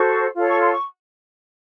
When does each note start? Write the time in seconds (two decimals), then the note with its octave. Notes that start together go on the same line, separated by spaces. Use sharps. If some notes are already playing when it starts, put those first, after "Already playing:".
Already playing: F#4 A4 C5 C#6
0.35 F4 A4 C#5
0.47 C#6
0.58 C6
0.70 C#6